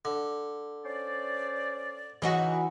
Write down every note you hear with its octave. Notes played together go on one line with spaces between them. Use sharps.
D3
C#4 C5 D5
C#3 E3 D#4 F#4